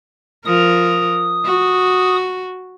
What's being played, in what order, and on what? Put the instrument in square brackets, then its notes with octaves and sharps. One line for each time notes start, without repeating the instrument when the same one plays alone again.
[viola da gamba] F3 A#4 [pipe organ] D#6
[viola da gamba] F#4